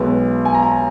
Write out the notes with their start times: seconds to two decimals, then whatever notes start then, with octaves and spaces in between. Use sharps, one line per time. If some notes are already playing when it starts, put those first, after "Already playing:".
Already playing: B1 B2 G#3 B3
0.45 G#5
0.55 A#5
0.63 G#5
0.72 A#5